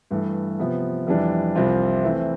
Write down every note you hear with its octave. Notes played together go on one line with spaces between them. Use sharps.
G2 E3 A3
C3 F3 B3
F2 E3 G3 D4
C2 C3 F3 C4 F4
E3 A3 C4